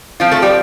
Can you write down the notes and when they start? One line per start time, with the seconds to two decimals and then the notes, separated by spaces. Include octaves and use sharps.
0.20 F3 C4 F4
0.32 A3 A4
0.42 G3 G4